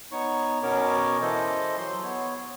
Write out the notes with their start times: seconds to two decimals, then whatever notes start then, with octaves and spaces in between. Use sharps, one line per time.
0.12 B3 D#4 C#5 C#6
0.63 B2 B3 C#4 A#4 C#5 D6
1.21 E3 A4 C5 D#5
1.78 F#3 C6
2.03 B3 C#5